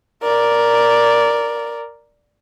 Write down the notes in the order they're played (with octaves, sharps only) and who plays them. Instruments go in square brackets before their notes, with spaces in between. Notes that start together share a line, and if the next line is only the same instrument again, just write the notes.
[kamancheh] A#4 D5